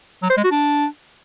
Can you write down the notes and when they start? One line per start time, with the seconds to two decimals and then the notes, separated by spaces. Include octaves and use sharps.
0.23 F#3
0.30 C5
0.37 G#3
0.44 F#4
0.52 D4